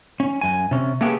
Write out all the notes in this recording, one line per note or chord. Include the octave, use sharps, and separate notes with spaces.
C#4
F#2 G#5
C3 C#4
A3 A#3 C#4 G4 G#4 B4